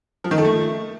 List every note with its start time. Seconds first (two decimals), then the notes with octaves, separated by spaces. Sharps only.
0.24 F3
0.31 D#3
0.38 A4
0.45 A3